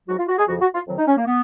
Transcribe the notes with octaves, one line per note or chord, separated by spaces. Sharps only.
G#2 F#3 F#4
F4
F#4
G#4
F2 C#3 F3 F#4
F#4
F4
F2 D#3 F#3
D#4
C#4
A#3
F3 B3